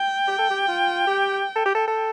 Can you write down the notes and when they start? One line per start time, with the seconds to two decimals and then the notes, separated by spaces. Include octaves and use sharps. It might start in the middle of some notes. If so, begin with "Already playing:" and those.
Already playing: G5
0.27 G4
0.38 A4
0.50 G4
0.68 F4
1.07 G4
1.56 A4
1.66 G4
1.75 A4
1.88 A4